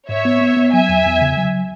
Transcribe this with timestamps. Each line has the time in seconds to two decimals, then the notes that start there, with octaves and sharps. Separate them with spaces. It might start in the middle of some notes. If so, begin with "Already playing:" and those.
0.09 G#2 C#5 E5
0.25 B3
0.41 B3
0.57 B3
0.73 F#3 E5 G#5
0.89 E2
1.05 E2
1.21 C#3
1.37 F#3